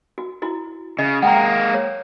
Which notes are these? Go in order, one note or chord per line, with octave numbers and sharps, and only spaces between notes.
F#4
E4 F#4
C#3 D#5
G#3 A#3 F#5 G5 A#5
C#5